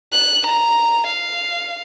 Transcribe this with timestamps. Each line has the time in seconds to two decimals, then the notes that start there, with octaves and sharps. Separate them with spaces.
0.12 F#6
0.47 A#5
1.07 F5